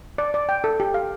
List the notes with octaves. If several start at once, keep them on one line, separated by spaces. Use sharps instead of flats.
D5
D5
G5
A4
G4
F5